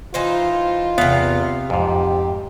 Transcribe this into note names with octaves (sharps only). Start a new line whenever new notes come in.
E3 D#4 F4 C5
E2 C3 B3 F5
F2 G#2 G4